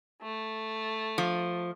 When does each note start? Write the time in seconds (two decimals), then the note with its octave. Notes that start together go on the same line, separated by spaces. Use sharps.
0.22 A3
1.18 F3